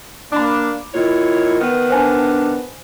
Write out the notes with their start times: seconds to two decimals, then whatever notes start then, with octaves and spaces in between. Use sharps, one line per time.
0.32 A#3 D4 B5 D6
0.94 A#2 D#3 E4 C#5
1.61 D#3 B3
1.90 D4 C5 G#5 A5